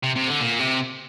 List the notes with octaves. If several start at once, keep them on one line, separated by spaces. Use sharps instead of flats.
C3
C3
D3
A#2
C3